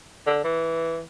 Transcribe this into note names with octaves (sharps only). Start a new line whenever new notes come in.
D3
E3